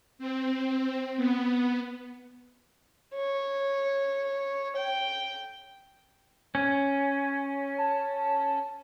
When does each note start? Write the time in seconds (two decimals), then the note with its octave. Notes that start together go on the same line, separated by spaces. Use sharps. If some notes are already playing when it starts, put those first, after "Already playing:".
0.19 C4
1.17 B3
3.14 C#5
4.76 G5
6.55 C#4
7.78 A5